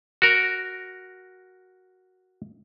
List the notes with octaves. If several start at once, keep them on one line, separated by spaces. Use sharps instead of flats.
F#4 A#4